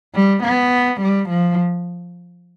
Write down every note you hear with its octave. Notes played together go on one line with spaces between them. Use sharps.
G3
B3
G3
F3